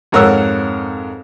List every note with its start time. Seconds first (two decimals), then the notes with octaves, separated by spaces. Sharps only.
0.12 F2 G#2 A#4 C#5 F#5 E6